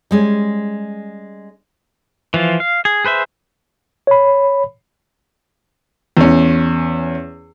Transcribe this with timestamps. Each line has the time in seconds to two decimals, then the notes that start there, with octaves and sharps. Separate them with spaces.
0.11 G3 G#3 C#4
2.34 E3 F3 F4
2.60 F5
2.85 G#4
3.05 G#4 B4 C5 E5
4.07 C#5 B5
6.17 E2 C#4